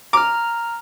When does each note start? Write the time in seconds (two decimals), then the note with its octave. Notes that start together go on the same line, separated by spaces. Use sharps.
0.13 A#5 D6 F6